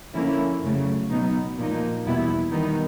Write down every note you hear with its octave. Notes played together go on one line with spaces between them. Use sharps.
D3 F3 A#3 C#4 E4
F2 C#3 F#3 A3
B2 F#3 B3 D#4
A#2 F3 A#3 D#4
E2 B2 G3 B3 E4
D#3 G3 B3 D#4